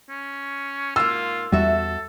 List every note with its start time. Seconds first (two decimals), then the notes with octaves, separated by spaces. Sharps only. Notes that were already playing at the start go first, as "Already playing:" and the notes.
0.09 C#4
0.96 G#2 A#3 F4 E6
1.52 E2 G3 F#4 A4 E5